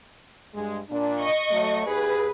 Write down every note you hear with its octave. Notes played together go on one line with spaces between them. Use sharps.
G2 G#3
A#2 D4
D#5 C#6
F#3 A3
D#2 G#4 B4